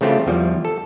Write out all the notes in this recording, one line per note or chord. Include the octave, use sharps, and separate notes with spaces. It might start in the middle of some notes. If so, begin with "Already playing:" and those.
C#3 E3 A3 C4 F4 G4
E2 F3 G3
A4